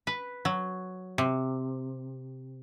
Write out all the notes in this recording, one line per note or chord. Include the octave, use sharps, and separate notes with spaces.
B4
F#3
C3